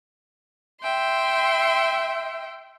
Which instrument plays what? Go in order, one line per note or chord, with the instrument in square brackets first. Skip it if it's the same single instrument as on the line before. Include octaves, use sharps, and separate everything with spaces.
[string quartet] E5 G5 C6